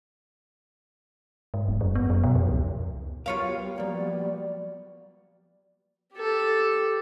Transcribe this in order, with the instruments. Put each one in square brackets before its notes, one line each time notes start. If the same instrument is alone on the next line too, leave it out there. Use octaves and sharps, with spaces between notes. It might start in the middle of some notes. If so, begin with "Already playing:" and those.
[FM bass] G#2
E1
F#2
B3
F#2
B2
F2
C#2
[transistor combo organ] F#3 G3 B3 [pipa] F4 C#5 F5 [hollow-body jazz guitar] A#4 C6
[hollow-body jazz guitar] F3 A#3 [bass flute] D5
[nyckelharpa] G4 A4